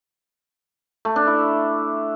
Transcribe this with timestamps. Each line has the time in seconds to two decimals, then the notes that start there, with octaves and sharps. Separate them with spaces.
1.05 A3
1.16 D4
1.27 E4